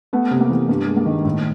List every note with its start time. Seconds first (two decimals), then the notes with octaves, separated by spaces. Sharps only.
0.13 A3 B3
0.31 C3
0.41 A#3
0.50 E3
0.69 G2 A#3
0.87 G#3
0.96 A#3
1.06 D#3
1.24 A2